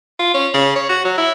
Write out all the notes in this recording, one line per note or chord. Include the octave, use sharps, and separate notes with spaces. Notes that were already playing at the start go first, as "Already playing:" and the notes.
F4
C#4
C#3
C#5
F#4
F#3
E4